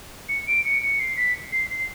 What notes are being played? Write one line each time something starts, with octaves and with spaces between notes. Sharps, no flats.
C#7
D7
C#7
C#7
C7
B6
C7
C7